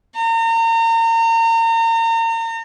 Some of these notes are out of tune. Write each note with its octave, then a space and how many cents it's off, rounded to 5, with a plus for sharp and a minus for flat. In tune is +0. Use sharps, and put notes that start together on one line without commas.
A#5 -35